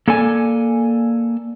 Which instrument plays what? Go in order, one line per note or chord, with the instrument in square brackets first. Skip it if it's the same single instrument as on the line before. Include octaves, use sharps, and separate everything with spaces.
[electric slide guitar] A#3 A4 D5 G#5